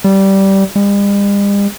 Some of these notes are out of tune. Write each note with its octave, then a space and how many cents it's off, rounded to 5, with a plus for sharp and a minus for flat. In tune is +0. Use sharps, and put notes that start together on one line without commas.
G3 -15
G3 +45